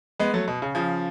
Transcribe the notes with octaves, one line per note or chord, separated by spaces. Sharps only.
G#3 B3
F#3 A3
B2
C#3
C#3 F3